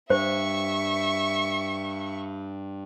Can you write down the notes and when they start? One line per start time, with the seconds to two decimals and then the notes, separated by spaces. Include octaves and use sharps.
0.10 G2 C5 E5 C#6